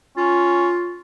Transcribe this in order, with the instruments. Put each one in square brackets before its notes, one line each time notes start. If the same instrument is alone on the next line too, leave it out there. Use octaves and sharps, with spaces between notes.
[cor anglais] C#4 [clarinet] F4